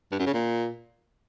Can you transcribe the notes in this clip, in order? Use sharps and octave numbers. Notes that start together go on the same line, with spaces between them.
G2
F#2
C#3
A#2